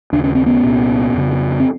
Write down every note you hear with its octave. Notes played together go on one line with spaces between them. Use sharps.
D#2 C#3 D4
C#4
C4
B3 C#4
C2 A#2
F2 C#3
C4